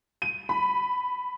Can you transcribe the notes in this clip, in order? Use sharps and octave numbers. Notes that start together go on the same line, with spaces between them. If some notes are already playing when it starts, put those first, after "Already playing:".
D#7
B5